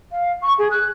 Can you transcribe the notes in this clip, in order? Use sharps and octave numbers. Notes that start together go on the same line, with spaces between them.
F5
C#6
G#4
F#6